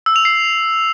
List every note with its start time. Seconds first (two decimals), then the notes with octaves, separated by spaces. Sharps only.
0.06 E6
0.16 F7
0.25 C7